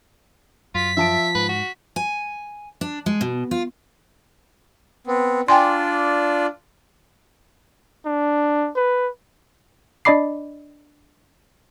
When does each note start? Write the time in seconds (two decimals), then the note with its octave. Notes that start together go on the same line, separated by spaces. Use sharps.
0.75 F#2 F4 B6
0.97 F3 E5 A5 D7
1.35 G#2 B4
1.49 F#4
1.96 G#5
2.81 D4
3.06 G#3
3.21 B2
3.51 F4
5.07 B3 C4
5.48 D4 F4 D5 G5 G#5 C6
8.05 D4
8.76 B4
10.05 D4 D5 D#5 B5 D6 C7